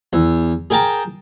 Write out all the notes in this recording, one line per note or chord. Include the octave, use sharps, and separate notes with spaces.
E2
G#4 A#4 G5 A5 A#5